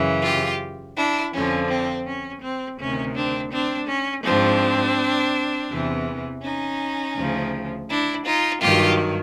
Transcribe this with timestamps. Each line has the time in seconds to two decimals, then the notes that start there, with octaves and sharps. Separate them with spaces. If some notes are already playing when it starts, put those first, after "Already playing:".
Already playing: F#2 C#3 E3
0.23 F4 G4
0.97 D4 E4
1.33 F2 D3 F3 C#4
1.69 C4
2.07 C#4
2.42 C4
2.79 D2 C3 D#3 C#4
3.15 C4 D4
3.52 C4 D4
3.88 C#4
4.24 G#2 F3 C4 D4
5.70 E2 C3 E3
6.43 C#4 D#4
7.17 D2 C#3 F3
7.89 D4 E4
8.26 D#4 F4
8.61 G2 D#3 F#3 F4 G4